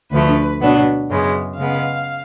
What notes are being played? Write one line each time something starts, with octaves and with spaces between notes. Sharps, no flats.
D2 D3 F3 A3 B4
B2 F#3 B3 D4
F#2 C#3 G#3 B3
C#3 G#3 B3 F5